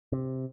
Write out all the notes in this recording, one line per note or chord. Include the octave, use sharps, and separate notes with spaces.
C3